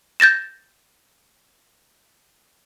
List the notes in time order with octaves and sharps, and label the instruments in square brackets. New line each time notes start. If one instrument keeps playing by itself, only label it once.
[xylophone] G6 A6 A#6 E7